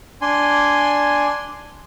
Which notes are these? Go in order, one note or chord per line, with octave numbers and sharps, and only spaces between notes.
D4 G#5 C6